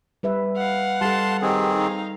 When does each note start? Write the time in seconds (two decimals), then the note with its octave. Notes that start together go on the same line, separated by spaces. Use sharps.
0.23 G3 B4 E5
0.57 F5 F#5
1.01 G3 A4 A5 C6
1.42 D#3 C4 G4 G#4
1.76 D#4 F5